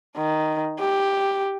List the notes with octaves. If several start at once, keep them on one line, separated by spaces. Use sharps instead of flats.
D#3
G4